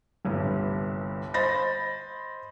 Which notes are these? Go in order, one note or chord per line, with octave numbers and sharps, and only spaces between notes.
G1 C2 G2
C5 D#5 B5 A6 A#6